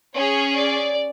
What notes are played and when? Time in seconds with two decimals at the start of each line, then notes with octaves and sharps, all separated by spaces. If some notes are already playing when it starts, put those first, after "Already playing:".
0.15 C#4 G#4 C#5
0.55 D5